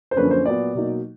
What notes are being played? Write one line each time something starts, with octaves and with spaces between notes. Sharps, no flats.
C5
F#2 D3 F3 A#3 C#4 B4
C5
A#2 F#3 B3 D5
B2 F#3 A#3 D#4